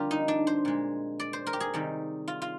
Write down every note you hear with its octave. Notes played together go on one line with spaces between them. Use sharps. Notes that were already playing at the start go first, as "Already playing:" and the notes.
Already playing: F2 D3 G3 F4 G4 A#4
D#4
D4
C5
A#2 G#3
D5
C5
A#4
G4
G#4
C3 D#3 G3
F4
F4